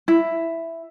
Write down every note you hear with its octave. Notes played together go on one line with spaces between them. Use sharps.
E4